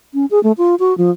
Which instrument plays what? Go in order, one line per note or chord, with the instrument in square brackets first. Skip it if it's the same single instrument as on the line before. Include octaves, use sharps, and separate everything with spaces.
[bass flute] C#4
G#4
A3
F4
F#4
F3